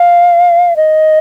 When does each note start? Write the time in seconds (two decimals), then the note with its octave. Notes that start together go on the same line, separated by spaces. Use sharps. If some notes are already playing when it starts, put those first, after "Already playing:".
Already playing: F5
0.76 D#5